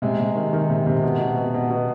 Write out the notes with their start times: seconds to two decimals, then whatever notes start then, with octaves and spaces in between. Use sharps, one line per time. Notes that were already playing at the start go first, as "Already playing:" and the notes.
0.02 C3 G#3
0.19 C3
0.36 D#3
0.53 D#3
0.70 C3
0.86 C3
1.03 B2
1.20 B2
1.37 B2
1.54 B2
1.70 B2